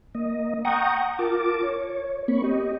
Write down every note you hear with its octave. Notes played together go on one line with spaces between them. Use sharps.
A#3 D#5
F#5 G5 A#5 C#6 D#6
F4 A#4 A5 D6
C#5
A#3 C4 B5 C#6
G4 D#5